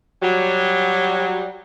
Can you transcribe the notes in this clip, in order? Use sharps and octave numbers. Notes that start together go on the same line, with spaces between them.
F#3 G3